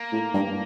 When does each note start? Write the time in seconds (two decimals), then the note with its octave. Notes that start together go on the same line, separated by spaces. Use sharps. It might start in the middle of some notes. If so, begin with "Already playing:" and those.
Already playing: A#3
0.12 A2
0.34 G2